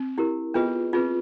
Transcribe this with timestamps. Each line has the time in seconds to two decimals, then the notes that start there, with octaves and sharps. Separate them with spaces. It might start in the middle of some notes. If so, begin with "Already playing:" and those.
Already playing: C4
0.18 E4 G4 A#4
0.54 B3 F4 G#4 B4 D#5
0.93 C4 F4 G#4 B4